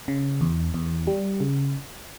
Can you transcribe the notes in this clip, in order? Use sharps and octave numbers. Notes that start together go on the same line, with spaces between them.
C#3
E2
E2
G3
C#3